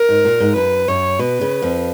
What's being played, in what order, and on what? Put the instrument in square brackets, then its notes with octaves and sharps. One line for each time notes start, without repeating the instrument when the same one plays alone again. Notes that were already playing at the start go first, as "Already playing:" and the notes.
Already playing: [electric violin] A#4
[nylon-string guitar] G#2
A#2
G#2
[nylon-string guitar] F#2 [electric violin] B4
[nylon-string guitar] F#2 [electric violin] C#5
[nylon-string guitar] B2 [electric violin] B4
[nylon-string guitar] C#3
F2 F3